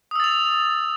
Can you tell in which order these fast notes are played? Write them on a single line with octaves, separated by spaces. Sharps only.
D#6 E6 A6 F7